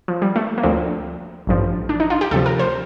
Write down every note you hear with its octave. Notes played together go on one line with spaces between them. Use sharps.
F3
G3
A3
A#3
D2 D3 F3 C4
A1 G2 F3
D4
D#4
F4
G4
D2 C3 F3 A4
A#4
C5